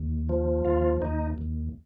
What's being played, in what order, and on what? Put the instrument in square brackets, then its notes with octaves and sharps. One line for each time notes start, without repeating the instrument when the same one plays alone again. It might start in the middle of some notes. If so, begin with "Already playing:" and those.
Already playing: [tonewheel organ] D#2
F3
D#2 F4
D#2 D#4
D#2